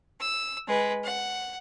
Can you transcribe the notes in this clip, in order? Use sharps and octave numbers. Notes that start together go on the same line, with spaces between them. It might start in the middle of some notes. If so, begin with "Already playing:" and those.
E6
G#3 B4
F#5